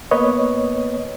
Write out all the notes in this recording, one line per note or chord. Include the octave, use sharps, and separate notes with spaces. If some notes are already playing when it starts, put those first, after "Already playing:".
A#3 B3 B4 C#5 D#5